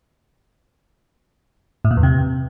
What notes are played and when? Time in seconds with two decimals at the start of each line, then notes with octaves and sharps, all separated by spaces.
1.85 A2
1.91 A#2
1.97 E2
2.03 C3